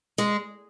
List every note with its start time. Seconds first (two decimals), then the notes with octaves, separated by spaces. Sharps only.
0.18 G#3